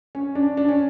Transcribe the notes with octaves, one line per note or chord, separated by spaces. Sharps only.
C#4
D4
D4
C#4